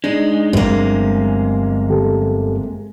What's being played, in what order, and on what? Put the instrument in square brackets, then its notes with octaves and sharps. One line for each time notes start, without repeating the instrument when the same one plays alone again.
[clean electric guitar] G#3 [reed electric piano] D4 [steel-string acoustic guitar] D#4
[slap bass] G1 G2 F#3 [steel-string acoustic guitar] C3 A#3
[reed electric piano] D3 G4 A4